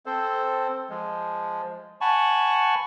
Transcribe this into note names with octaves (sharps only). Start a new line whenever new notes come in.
C4 A4 C5
F3 G#3
F#5 G#5 A5 B5 C#6